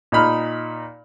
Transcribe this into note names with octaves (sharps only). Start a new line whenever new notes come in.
A#2 D#4 B5 F6